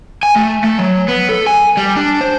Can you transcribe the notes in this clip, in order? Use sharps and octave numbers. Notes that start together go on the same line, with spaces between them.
G#5
A3
A3
F#3
B3
A4
G#5
G3
D4
C5